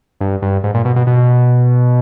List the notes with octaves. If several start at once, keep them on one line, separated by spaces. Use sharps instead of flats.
G2
G2
G#2
A#2
B2
B2
B2